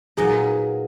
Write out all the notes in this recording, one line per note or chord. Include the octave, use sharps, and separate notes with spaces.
A#2 F#3 B3 D#4 G#4